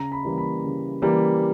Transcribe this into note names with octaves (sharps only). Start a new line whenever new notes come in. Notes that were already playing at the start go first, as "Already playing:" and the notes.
Already playing: C#3 A#5
B5
E3 G3 A#3
B5
C#3
E3 G3 A#3